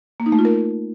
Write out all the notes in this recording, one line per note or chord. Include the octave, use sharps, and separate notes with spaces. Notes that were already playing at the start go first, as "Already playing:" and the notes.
A#3
D#4
A3
F4
A#4